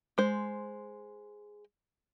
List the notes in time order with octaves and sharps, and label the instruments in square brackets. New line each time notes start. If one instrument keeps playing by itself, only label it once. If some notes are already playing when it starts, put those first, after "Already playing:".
[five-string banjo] G#3 C5